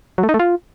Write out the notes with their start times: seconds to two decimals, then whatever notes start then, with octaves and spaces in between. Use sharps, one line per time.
0.18 F#3
0.23 A3
0.29 D#4
0.34 A3
0.39 F4